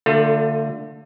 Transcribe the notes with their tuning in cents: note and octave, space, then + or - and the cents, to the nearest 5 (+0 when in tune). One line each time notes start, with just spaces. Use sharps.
D3 +5 A3 +35 F4 +35